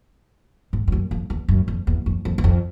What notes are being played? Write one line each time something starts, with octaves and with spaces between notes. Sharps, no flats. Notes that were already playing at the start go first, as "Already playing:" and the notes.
G#2
F2
F#2
F2
E2
F#2
F2
E2
F2
F2
E2
F2